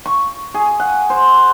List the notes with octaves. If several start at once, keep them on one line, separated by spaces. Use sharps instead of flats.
C#6
G#4
F#5
C5